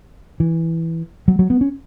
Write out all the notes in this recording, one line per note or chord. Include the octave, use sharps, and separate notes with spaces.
E3
F#3
F#3
B3
C#4